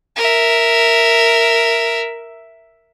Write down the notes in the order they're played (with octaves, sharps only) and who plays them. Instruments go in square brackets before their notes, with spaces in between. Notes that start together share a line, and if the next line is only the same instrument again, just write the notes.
[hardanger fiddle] A#4 E5